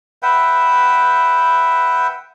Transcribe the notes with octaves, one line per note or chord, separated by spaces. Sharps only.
B4 E5 F#5 G5